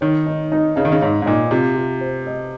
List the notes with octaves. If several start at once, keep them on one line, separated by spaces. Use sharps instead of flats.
D#3 C#5
D#4
D#4
C#3 D#4
D#3
C#3
G#2 C#5
G#2
A#2 D#4
C3 F4
F4
C5
D#5